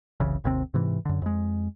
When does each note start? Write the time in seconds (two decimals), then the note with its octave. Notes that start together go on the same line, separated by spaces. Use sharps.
0.20 F#1 C2 C#3 E3
0.44 G#1 D#2 C3 C4
0.74 G#2 C3 E3
1.05 F#2 D3
1.22 F2 G#3